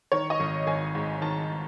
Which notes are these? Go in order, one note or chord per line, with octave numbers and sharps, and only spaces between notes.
D#3 C#5
D#5
G#1
G#1 G#5
G#2
D#3 A5